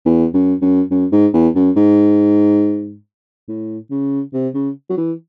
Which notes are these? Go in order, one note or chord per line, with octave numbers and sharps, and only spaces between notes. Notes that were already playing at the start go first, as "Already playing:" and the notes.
E2
F#2
F#2
F#2
G#2
E2
F#2
G#2
A2
C#3
C3
C#3
F#3
E3